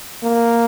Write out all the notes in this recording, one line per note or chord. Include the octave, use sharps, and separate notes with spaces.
A#3